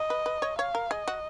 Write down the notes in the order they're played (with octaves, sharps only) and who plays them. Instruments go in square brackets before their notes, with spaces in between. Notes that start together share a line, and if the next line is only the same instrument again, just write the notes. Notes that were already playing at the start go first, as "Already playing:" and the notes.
Already playing: [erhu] D#5
[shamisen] B4
B4
C#5
[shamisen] C#5 [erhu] F5
[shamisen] A#4
[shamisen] G#4 [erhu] D#5
[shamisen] F#4